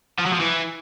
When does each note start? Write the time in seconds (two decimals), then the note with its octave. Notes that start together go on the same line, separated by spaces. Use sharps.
0.19 F3
0.26 F#3
0.33 F3
0.40 E3